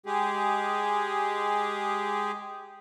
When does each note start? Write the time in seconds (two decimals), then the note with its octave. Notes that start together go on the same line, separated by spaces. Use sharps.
0.06 G#3 G4 G#4